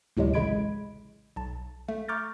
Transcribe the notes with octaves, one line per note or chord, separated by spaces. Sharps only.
D2 A2 C3 F#3 G#3
A1 C#3 G#3 B5 G#6 D7
B1 A5
A3
A#5 C#6 D6 F6 G6 A6